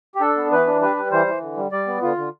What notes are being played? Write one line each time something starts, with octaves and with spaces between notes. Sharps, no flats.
G4
D4 A4
B3
E3 B4
D4
G3 B4
G3
E3 C5
E3
D3
G3
G3 D5
B3
D3 F4
D3